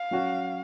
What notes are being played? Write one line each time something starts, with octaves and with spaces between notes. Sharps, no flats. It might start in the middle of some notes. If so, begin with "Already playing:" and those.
Already playing: F5
F#3 C#4 F#4